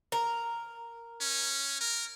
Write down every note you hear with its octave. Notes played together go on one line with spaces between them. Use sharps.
A#4
C#4
A#4